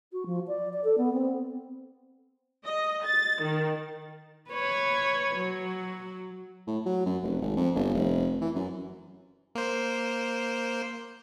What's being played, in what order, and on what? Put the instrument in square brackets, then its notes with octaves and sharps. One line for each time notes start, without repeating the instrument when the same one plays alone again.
[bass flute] F#4
F3
D5
D5
A4
B3
C4
[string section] D#5
A6
D#3
[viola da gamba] B4 C#5
F#3
[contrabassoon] A2
F#3
F#2
F1
G#1
F2
G1
F1
E3
F#2
[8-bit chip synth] A#3 C5